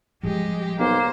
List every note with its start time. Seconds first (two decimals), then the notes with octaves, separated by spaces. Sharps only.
0.23 F3 G3 G#3 G4
0.79 B1 A#3 C5